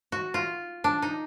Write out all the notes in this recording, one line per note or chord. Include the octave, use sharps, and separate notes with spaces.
F#4
F4
D4
D#4